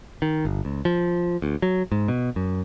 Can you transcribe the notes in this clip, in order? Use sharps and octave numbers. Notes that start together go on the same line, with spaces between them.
D#3
G1
C#2
F3
D2
F#3
G#2
B2
F#2